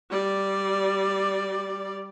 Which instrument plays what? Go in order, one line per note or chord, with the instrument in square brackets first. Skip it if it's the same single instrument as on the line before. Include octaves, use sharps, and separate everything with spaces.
[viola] G3 D5